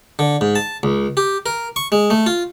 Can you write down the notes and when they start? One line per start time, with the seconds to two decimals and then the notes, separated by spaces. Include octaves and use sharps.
0.19 D3
0.41 G#2
0.55 A5
0.83 C#2
1.17 G4
1.46 A#4
1.76 C#6
1.92 G#3
2.10 A3
2.26 F4